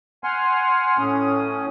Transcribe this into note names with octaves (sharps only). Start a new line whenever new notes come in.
F#5 G#5 C6 F6
A2 C#4 D#6